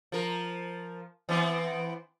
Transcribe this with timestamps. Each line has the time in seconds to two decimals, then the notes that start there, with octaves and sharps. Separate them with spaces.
0.12 F3 A#4
1.29 E3 B3 C4